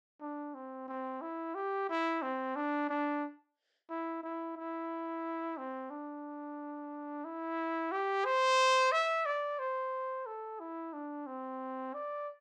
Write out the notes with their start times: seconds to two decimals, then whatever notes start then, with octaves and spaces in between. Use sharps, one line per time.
0.21 D4
0.54 C4
0.88 C4
1.21 E4
1.55 G4
1.89 E4
2.22 C4
2.56 D4
2.89 D4
3.90 E4
4.23 E4
4.57 E4
5.57 C4
5.90 D4
7.24 E4
7.92 G4
8.25 C5
8.92 E5
9.26 D5
9.59 C5
10.26 A4
10.60 E4
10.93 D4
11.26 C4
11.94 D5